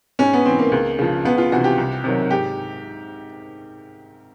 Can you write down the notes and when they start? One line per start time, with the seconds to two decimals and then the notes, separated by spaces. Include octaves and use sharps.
0.19 G#2 C#4
0.33 B3
0.46 E3 C4
0.59 A#3
0.72 C#2
0.99 C#3 F3
1.25 C#2 B3
1.38 F4
1.52 C3 E3 F#4
1.64 G4
1.78 C2
2.04 C3 D#3 F#3
2.31 G#2 G4